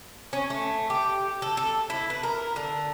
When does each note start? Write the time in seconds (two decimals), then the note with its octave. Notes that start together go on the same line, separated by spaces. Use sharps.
0.33 C#4
0.50 A3
0.90 G4
1.42 A4
1.57 A4
1.90 E4
2.10 B4
2.23 A#4
2.56 D3